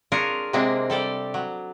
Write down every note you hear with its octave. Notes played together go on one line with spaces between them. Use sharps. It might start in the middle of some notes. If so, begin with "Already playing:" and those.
D4 F4 G#4 A#4 C#5
C3 G#3 A#3 C4 D4
G3 A4 D5 G5
F#3